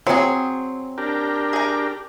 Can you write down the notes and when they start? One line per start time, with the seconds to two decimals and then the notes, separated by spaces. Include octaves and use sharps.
0.07 F#3 C4 G#4 C5
0.98 D4 G4 A#4
1.53 G#4 A#5